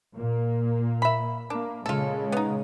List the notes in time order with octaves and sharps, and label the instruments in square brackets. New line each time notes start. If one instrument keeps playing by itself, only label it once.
[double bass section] A#2 A#3
[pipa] E5 B5
[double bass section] A#3 [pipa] D4
[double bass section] A#2 C#3 G#3 [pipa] F4 A4
[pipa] B3 D#4